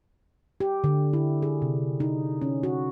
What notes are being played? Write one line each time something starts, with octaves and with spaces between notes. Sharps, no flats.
G4
D3
E4
G#4
C3
D#4
C#4
F#4